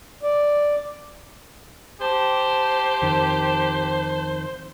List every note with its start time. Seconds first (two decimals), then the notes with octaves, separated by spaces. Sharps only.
0.23 D5
2.01 G4 C5 A5
3.02 F2 D#3